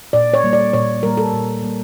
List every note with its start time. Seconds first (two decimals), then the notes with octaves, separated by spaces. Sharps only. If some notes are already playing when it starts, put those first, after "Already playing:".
0.13 A#2 D5
0.34 C#5
0.44 G3 A#3
0.53 D5
0.73 A#2 C#5
1.03 G3 A#3 A#4
1.18 A4
1.33 A#2
1.62 G3 A#3